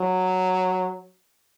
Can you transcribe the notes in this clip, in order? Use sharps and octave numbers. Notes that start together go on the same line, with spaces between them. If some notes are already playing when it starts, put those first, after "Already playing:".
Already playing: F#3